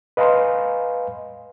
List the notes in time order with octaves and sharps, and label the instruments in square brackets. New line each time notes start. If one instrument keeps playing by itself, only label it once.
[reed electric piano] B4 D#5 F5 G#5 A#5 C6